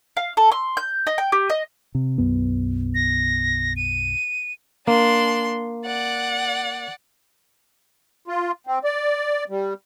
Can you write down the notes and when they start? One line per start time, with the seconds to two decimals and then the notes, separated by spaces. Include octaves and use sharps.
0.17 F5
0.37 A4
0.52 C6
0.77 G6
1.07 D#5
1.18 G5
1.32 G4
1.50 D#5
1.95 C3
2.18 B1 F#2 B3
2.95 A#6
3.76 D#7
4.87 A#3 D4 C6
5.86 D5 F#5
8.28 F4
8.67 C4
8.84 D5
9.50 G3